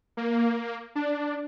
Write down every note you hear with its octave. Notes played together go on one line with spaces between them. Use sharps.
A#3
D4